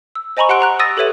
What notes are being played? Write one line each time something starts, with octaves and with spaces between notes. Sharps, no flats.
E6
C5 D#5 G#5 A#5 B5 C#6
G4 F#5 C6 F#6 D7
F#5 A#5 F#6
D#6 E6 A6 A#6 D#7
G4 A4 B4 C#5 E5 D#7